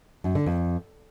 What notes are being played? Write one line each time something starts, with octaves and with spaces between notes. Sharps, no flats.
F#2
D3
F2